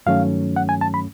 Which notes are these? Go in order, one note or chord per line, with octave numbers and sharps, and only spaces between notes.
G2 D#3 F#3 A3 C#4 F5
F#5
G#5
A5
B5